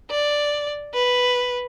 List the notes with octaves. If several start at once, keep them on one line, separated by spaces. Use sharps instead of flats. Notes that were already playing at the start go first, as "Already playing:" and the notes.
D5
B4